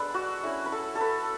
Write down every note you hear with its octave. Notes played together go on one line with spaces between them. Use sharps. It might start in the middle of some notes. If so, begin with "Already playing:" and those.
Already playing: G#3 B3 D4 A4 B4
F#4
A3 C#4 E4
B4
A4
A4
B4